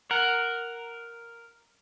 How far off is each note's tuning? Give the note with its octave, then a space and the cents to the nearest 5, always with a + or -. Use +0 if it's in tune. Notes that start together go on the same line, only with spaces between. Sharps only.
A#4 +0 F#5 +0